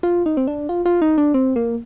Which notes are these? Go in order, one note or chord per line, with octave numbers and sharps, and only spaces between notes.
F4
D#4
C4
D4
F4
F4
D#4
D4
C4
A#3